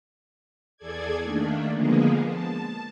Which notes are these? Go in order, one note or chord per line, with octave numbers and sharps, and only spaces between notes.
E2 G#4 A4 D5 G#6
D#3 A3 A#3 D4
D3 F3 G#3 A#3 B3 G#4
A5